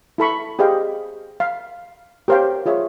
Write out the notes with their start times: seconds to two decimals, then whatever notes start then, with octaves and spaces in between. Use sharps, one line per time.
0.18 E4 A4 B5 C#6
0.59 G4 G#4 C5 D#5 F5 G5
1.40 F5
2.28 G4 A#4 C5 C#5 F5 G5
2.66 F4 G#4 C#5 E5